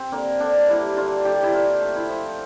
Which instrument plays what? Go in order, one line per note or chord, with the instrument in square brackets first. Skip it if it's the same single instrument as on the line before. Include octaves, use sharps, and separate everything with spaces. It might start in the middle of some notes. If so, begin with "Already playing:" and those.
Already playing: [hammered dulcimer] C4
D3 A#3
D3 D4
G3 E4
D3 F4
D3 G4
E4
D3 F4
A3
E4
F3